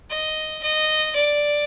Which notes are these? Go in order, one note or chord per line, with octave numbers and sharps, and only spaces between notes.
D#5
D#5
D5